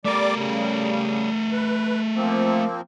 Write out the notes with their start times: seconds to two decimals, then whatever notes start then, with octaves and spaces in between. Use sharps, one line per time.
0.05 G3 A3 A#4 D5 D6
0.36 C#3 G3
1.52 B4
2.15 F3 A#3 C4